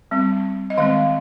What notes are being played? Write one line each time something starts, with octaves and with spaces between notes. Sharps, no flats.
G3 C4
D#5
D#3 G#3 C4 F5